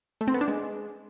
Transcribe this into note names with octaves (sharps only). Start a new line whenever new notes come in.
A3
C4
B3
D4
G#3